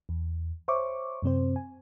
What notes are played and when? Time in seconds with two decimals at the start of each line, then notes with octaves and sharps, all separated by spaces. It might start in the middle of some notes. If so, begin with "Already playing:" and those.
0.09 E2
0.68 C5 C#5 E5 C#6 D6
1.22 F#2 C3 C4 C5
1.56 G#5